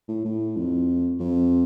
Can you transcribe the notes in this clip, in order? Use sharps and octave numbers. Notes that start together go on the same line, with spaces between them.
A2
A2
F2
F2